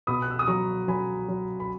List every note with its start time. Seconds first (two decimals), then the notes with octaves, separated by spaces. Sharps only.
0.07 B2 B5 D#6
0.22 F#6
0.31 E6
0.39 D#6
0.47 F#3 A#5 C#6
0.88 F#3 G#5 B5
1.28 F#3
1.60 B5